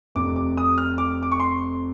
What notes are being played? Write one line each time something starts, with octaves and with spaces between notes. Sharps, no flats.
F1 F2 C3 D6
D6
D#6
F6
D6
D6
C#6
C6